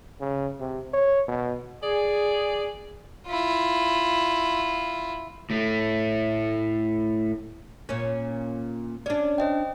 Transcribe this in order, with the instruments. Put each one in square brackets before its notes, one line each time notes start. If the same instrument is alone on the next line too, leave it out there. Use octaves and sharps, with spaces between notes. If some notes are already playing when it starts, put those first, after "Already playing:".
[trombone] C#3
C3
C#5
B2
[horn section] G#4 [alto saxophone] D5
[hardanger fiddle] E4 F4
[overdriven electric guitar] A2 A3
[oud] A#2 C#4
[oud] C#4 D4 [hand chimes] D5
[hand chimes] C5 D#5 G5